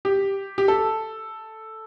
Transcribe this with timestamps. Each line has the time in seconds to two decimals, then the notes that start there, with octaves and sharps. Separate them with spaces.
0.05 G4
0.58 G4
0.68 A4